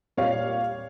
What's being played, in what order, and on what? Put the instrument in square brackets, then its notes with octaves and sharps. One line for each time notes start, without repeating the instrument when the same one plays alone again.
[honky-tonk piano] A#2 G3 C#5 F5